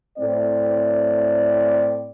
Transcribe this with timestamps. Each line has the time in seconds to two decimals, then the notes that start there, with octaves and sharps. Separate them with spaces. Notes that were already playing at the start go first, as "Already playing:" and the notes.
0.19 A2 C4 D5